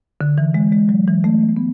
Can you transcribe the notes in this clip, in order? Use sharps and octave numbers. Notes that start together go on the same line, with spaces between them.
D3
E3
G#3
G#3
F#3
E3
A3
B3
A3
B3